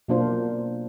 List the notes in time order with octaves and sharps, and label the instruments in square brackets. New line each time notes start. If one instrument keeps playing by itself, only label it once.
[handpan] B2 F#3 A#3 D4 F4 C5